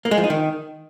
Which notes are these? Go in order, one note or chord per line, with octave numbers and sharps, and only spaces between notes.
A#3
G#3
F3
D#4
D#3